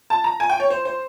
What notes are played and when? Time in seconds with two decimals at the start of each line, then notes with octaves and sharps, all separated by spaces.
0.10 A5
0.24 A#5
0.40 G#5
0.50 G5
0.60 C#5
0.70 C5
0.85 C5